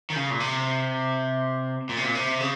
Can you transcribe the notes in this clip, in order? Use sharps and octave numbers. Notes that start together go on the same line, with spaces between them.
D#3
C#3
A#2
C3
A#2
C3
A#2
C3
C#3